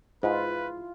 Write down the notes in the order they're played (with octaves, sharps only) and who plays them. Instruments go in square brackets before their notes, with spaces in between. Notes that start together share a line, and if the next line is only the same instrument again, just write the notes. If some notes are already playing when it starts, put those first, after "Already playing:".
[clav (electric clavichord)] G#2 [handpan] E4 F4 [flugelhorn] B4